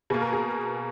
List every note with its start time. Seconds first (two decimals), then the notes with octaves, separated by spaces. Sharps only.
0.10 B2 A#3 G#4
0.21 A#4
0.33 G#4